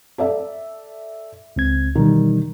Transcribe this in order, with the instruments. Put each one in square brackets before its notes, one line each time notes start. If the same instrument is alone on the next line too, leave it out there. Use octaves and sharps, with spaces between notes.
[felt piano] A4 D5 E5
[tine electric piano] C#2 C4 G#6
[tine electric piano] B2 E3 G3 [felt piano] D#3